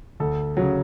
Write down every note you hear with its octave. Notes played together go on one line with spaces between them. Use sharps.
D2 A4
C#3 F#3